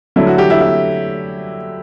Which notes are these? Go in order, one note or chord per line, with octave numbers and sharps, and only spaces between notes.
D3 F#3 A3 E4
F#4
G4
E4
E4